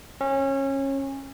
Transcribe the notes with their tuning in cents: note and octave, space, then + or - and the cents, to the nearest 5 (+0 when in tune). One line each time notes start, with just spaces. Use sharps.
C#4 -25